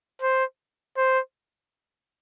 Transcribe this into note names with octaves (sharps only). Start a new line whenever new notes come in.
C5
C5